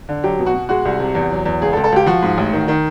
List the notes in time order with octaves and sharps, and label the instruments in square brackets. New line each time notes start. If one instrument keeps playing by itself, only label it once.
[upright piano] D3
F#3 G4
B2
F#4
B2
G#3 F#4
C2
C3
E2
F#3
E2
C#2 G#4
A4
C#2
A4
C#2 G4
F3 F#4
G#2
A1
D#3
D#3